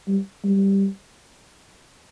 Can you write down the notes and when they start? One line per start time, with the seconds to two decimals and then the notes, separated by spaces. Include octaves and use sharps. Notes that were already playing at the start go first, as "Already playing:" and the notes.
0.08 G3
0.44 G3